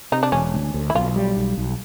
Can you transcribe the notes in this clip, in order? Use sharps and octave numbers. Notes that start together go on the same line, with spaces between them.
C3 D#4
D4
E1 C#4
D2
D2
E4
B1 F4
G3
B1
B1